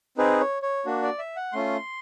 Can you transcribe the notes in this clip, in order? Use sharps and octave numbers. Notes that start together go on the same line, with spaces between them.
C4 D#4 G#4 B4
C#5
C#5
A#3 D4 F#4
D5
E5
F#5
A3 C#4 F4 C6